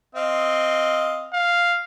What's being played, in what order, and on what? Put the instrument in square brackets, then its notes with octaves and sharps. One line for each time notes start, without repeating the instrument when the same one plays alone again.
[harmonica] C4 D#5 F5
[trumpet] F5